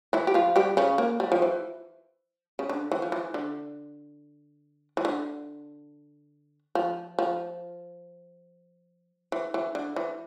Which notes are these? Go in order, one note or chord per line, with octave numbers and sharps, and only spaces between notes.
E3 E4
G4
F3 F4
G3 G4
C#3 C#4
A#3
G3
F3
E3
C#3
D3
E3
F3
E3
D3
E3
D3
F3
F3
E3
E3
D3
E3